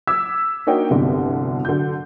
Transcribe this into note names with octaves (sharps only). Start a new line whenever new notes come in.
D6 E6 G#6 B6
A#3 D4 D#4 F#4 C#5 G5
F1 C2 G2 B2 D3
D3 F#3 G6